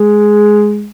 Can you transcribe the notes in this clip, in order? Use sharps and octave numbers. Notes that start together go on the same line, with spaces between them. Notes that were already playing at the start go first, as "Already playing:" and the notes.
Already playing: G#3